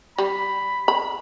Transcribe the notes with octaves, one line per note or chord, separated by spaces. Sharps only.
G3 B5
B5